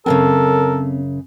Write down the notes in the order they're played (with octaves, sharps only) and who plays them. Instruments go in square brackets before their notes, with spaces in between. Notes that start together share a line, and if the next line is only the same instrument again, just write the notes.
[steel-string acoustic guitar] F#2 A2 C#3 [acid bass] C4 [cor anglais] A4 [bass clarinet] A#4